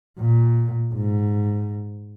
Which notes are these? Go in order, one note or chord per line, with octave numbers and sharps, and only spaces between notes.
A#2
G#2